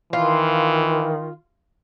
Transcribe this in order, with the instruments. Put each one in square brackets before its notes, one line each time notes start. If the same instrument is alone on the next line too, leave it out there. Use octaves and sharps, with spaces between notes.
[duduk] D#3 [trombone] E3 [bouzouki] F4